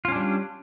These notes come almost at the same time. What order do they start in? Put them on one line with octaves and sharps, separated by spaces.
F4 C#4 D4 G3